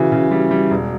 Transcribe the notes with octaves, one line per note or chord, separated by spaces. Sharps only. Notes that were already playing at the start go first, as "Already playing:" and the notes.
Already playing: C#3 E3 F#4
C#3
G3
G3
E1